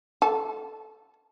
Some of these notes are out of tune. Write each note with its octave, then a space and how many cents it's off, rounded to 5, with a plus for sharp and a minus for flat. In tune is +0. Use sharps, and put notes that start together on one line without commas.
A4 -5 A5 -40